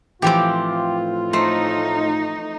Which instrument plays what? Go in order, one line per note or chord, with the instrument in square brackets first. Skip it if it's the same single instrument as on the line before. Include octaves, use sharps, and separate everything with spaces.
[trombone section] A2 F4 [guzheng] E3 F3 C4 [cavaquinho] G4 D6
[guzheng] A3 [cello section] D#4 [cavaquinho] C5